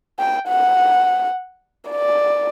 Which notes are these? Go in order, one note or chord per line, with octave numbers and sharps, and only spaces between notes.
G5
F#5
D5